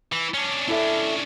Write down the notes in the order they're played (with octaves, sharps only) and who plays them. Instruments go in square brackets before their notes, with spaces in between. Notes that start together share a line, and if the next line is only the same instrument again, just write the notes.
[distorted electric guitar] E3
C#4 D4
[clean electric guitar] E4 A4 E5